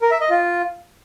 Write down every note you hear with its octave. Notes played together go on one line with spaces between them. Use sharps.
A#4
E5
D#5
F4